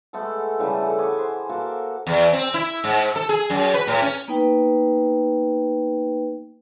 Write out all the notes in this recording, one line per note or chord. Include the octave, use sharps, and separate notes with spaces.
G#3 A3 B3 A4
C#3 E3 G3 A3
A4
B3 G#5 C#6 D6
C5
A#3 F#4 A4
E2
C4
E4
G#2
A4
G#4
F#2
B4
A2
C#4
A#3 B3 D#4 B4 G5